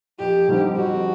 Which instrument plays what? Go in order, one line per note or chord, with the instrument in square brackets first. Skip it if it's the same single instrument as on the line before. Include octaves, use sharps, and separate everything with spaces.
[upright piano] F2 [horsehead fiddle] G4
[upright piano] D3 G3 C4 D#4
[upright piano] F2 [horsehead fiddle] F#4